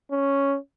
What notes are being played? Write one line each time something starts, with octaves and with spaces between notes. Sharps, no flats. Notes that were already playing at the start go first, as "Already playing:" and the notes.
C#4